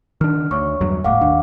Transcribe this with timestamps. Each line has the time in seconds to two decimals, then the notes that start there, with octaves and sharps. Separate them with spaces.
0.21 D#3 D4 F6
0.51 D2 C#5 C#6
0.81 E2 G2 F#3
1.04 G1 A2 F5 F#5 D6
1.21 D#2 D4